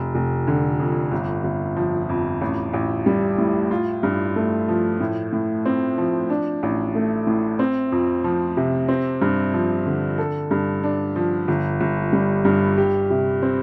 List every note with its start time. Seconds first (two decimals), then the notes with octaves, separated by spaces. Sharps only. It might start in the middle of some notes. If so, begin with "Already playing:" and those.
Already playing: F1
0.15 F1
0.47 D3
0.79 F2
1.12 G1
1.44 G1
1.76 F3
2.09 F2
2.41 A1
2.73 A1
3.06 G3
3.38 A2
3.71 F4
4.03 G2
4.36 A3
4.68 F3
5.00 A2
5.33 A2
5.65 C4
5.98 F3
6.30 D4
6.63 A1
6.95 A3
7.27 A2
7.59 C4
7.92 F2
8.24 F3
8.57 C3
8.88 C4
9.22 G2
9.54 F3
9.86 D3
10.18 A4
10.51 G2
10.83 D4
11.16 F3
11.48 G1
11.80 G1
12.13 G3
12.45 G2
12.77 G4
13.10 C3
13.42 C4